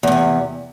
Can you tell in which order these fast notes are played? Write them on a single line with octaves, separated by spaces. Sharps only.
E2 A2 C3